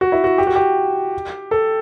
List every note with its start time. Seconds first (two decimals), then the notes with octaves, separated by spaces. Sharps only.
0.01 F#4
0.12 E4
0.24 F#4
0.38 G4
0.47 F#4
0.55 G4
1.51 A4